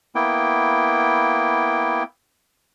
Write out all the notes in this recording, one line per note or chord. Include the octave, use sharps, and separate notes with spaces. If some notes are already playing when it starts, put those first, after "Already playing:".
A#3 B3 E4 G5